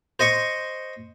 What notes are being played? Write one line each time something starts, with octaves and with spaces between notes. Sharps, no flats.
C5 D#5 C6 C#6